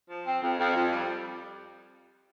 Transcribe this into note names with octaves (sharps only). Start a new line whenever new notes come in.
F3
C4
F2
F2
F2
G3